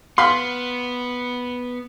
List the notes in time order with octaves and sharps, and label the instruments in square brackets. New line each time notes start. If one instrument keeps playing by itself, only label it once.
[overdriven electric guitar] B3 [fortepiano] F5 B5 C6